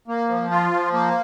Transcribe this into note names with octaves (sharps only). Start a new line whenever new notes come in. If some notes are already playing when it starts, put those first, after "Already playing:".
A#3
F3
F4
F3
A#3